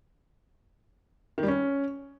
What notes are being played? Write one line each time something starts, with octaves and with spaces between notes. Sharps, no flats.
D#3
G3
C#4